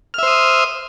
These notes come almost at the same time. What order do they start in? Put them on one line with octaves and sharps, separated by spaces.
F6 E5 C5 D#6